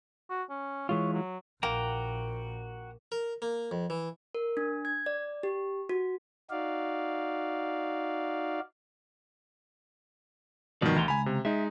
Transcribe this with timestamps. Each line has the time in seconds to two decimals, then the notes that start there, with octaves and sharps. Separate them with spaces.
0.30 F#4
0.50 C#4
0.89 E3 G#3 F4 C#5
1.14 F#3
1.63 A#1 A#3 F#4 G5 A#5
3.12 A#4
3.42 A#3
3.71 F2
3.90 E3
4.35 A#4
4.57 D4
4.85 G#6
5.06 D5
5.43 G4
5.89 F#4
6.50 D#4 F#4 D5 F5
10.82 G2 B2 D#3 F3 D5
10.96 D2 E3 A#5 C6
11.08 C#2 G#5 A#5 B5
11.26 C3
11.45 G#3 D#4 E5